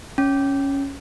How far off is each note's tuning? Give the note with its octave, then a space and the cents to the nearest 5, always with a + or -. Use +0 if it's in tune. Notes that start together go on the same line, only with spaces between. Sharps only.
C#4 +0